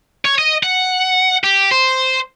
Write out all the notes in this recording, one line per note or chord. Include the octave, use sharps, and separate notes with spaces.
C#5
D#5
F#5
G4
C5